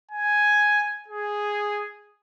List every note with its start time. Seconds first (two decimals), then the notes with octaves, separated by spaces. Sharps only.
0.12 G#5
1.08 G#4